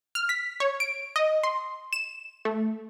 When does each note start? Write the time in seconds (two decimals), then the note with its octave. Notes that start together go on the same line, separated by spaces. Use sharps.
0.15 F6
0.29 B6
0.60 C#5
0.80 D7
1.16 D#5
1.43 C6
1.93 E7
2.45 A3